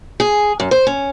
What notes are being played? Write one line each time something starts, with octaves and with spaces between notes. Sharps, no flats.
G#4
F#2
C5
C#4